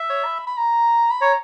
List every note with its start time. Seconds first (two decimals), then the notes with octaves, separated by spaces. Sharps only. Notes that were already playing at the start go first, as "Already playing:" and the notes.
Already playing: E5
0.10 C#5
0.25 B5
0.47 B5
0.57 A#5
1.11 B5
1.21 C#5 A#5